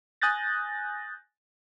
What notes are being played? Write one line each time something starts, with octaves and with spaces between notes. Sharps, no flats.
G#5 D#6 F#6 G6 A6 A#6